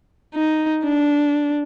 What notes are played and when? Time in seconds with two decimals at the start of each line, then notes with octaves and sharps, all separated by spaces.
0.35 D#4
0.84 D4